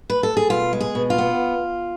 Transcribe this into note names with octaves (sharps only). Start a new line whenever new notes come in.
B4
A4
G#4
B2 F4
G#3
G#4
B2
F4
B3